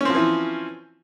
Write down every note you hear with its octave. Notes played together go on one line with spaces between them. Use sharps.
E3 F3 C4 C#4